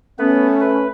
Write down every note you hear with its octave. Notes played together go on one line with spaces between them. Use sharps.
A3 B3 C#4 B4
B4